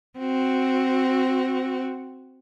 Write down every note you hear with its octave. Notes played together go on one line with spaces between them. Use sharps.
C4 F#4